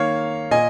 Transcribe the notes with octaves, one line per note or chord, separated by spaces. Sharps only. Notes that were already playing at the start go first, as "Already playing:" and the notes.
Already playing: D#3 A#3 C#5 F5
A#2 D#5 G#5